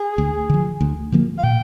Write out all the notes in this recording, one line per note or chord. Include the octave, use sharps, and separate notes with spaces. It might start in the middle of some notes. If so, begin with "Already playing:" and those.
Already playing: G#4
D2
D3 F3
D2
D3 F3 A#3
F5
A#2 G5